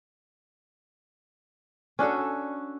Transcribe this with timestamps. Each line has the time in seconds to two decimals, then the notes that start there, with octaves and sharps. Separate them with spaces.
1.99 C#4 D4 F#4 A4